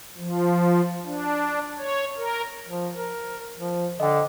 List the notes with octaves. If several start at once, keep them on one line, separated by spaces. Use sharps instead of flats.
F3
D4
C#5
A#4
F3
A#4
F3
D3 D#5 G5